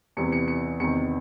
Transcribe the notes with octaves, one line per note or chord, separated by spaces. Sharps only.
E2 C3 E3 C#7
C#7
C#7
E2 C3 D#3 C#7